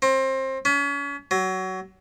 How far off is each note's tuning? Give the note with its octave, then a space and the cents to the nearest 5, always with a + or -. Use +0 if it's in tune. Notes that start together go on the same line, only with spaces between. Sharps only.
C4 +25
C#4 +35
F#3 +20